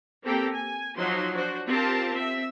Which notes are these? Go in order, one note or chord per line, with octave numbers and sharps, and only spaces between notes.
A#3 C4 G4 A4 G5 A#5
G#5
F3 F#3 D#4 F#4 C6
D4 F#4 C5
C4 F4 G4 A#4 C5 A5
C4 E5